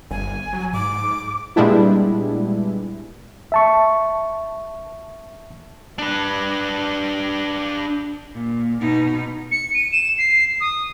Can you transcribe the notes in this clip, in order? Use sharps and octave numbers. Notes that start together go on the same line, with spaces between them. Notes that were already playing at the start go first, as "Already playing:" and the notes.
G1 G#5
F#3
G#2 D6
A#2 G3 G#3 B3 D4 E4
E5 A5 C#6
D4 B4
A#2
B2 D#4
C#7
D#7
E7
C7
D#6